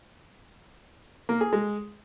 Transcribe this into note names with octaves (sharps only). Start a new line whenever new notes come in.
A#3
G#4
G#3